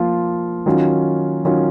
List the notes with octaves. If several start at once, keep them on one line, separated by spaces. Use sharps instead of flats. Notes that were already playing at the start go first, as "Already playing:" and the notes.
Already playing: F3 A#3 F4
D#3 F#3 C#4 F4
D#3 F#3 C#4 F4